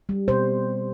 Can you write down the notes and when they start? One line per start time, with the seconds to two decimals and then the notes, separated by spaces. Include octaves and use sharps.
0.09 G3
0.28 B2 C5